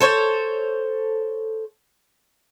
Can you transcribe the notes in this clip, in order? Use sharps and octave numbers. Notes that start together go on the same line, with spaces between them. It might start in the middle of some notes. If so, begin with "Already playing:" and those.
A4 C5 C#5